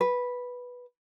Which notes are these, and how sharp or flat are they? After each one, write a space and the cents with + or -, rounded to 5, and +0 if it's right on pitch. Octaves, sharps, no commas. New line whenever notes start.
B4 -5